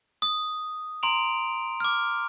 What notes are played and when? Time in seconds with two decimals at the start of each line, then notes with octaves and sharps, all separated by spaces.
0.22 D#6
1.03 A#5 C6 D7 F7
1.80 D6 F6